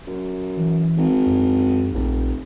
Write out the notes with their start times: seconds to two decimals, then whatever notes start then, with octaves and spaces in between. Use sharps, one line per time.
0.07 F#2
0.57 E3
0.97 G#1
1.27 F#2
1.94 F1 A#1